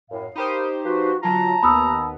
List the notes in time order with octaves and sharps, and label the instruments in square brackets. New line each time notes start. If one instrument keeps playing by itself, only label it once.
[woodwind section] F#2 A2 [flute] F5
[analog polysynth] D#4 G4 C5 [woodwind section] A#4 B5 D#6
[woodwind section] F3 B4 [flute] F#4
[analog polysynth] D3 F#3 F4 [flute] A5 [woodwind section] A#5
[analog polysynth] D#2 B3 [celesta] B5 D#6 E6